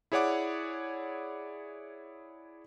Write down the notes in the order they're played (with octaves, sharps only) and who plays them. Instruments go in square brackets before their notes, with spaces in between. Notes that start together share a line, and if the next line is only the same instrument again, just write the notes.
[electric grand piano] E4 G#4 C#5 D5 F#5 D6